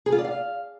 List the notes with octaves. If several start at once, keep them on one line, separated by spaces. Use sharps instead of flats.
G#4
F4
D5
F5